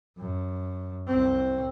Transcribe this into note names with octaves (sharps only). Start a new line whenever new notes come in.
F#2
C2 C4